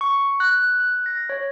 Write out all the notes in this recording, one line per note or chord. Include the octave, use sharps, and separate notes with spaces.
C#6
F#6
F#6
A#6
C#5